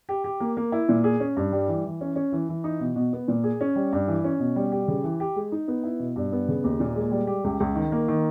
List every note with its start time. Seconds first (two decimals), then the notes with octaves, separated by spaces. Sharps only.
0.09 G4
0.24 G4
0.40 A#3
0.57 A#3
0.72 E4
0.89 A#2
1.04 G#4
1.20 C#4
1.37 G2
1.52 G3
1.68 E3
1.85 E3
2.01 C#4
2.16 C#4
2.32 E3
2.49 E3
2.64 D#4
2.80 B2
2.96 B2
3.13 B3
3.28 A#2
3.44 G#4
3.61 C#4
3.76 G3
3.93 G2
4.08 E3
4.24 C#4
4.39 B2
4.56 G3
4.72 G4
4.88 C#3
5.04 E3
5.20 G4
5.36 G#3
5.52 D#4
5.68 B3
5.84 E4
5.99 B2
6.16 G2
6.32 B3
6.48 C#3
6.64 D#2
6.80 A#2
6.96 G#3
7.11 G3
7.27 G4
7.44 C#2
7.60 C#2
7.75 D#3
7.92 A#3
8.08 D#3